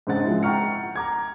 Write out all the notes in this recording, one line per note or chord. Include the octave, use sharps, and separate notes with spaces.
G#2 C#3 C4 D4 F#5 A6
F3 G#3 E4
F#5 G5 A#5 C#6 F6 C#7
A#5 D6 G#6